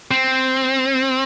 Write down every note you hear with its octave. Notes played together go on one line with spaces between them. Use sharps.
C4